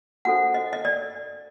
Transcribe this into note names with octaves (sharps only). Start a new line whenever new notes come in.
D4 F#4 A4 C5 F#5
D#5
D#5
D5